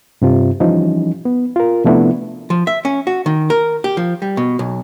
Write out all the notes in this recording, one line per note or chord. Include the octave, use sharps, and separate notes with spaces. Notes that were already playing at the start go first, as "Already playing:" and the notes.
G2 C3 F4
E3 F3 G3 C#4 D#4
B3
F4 A#4
C3 F3 A3 B3 D4 E4
F3
E5
C#4
F#4
D#3
A#4
G4
F3
G3
B2
B1